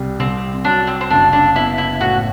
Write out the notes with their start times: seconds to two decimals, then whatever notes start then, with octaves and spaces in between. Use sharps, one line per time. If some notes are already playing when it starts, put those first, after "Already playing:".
Already playing: C2 G3
0.19 C2 C4
0.65 F#3 D4
0.87 C4
1.01 C4
1.10 F#1 D4
1.33 D4
1.55 B3 E4
1.78 E4
2.01 A2 F#4